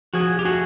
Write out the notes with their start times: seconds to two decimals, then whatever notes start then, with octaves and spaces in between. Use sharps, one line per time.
0.14 F3 F#4 G#4
0.39 G4
0.45 A3 F#4 G#4